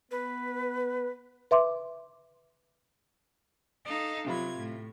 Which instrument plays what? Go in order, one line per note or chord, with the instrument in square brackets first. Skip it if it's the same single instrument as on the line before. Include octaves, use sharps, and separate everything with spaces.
[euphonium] B3 [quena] B4
[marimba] B4 E5 C6 D6
[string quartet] D#4 A4 F5
[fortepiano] C3 F4 B5 [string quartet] F#3 G#6
[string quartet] A2